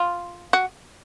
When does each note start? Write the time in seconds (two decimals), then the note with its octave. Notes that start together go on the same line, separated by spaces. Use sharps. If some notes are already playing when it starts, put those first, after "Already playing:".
Already playing: F4
0.53 F#4